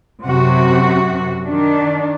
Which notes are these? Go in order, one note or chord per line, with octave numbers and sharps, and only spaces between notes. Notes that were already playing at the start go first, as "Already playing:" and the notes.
F#2 C3 F#4
D#3 D4